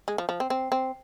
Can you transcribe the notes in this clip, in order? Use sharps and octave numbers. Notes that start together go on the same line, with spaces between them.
G#3
F3
F3
C4
C4
C4